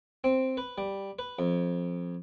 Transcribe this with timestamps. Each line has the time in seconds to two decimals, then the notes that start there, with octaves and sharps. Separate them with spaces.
0.24 C4
0.57 B4
0.78 G3
1.19 B4
1.39 F2